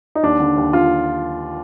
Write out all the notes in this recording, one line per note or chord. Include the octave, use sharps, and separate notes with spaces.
D#4
D#2 D4
D3
D#2
D3 F4